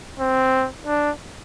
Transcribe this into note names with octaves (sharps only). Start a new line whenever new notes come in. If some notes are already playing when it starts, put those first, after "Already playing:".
C4
D4